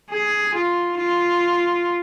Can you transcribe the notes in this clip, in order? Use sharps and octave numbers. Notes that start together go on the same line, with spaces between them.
G#4
F4
F4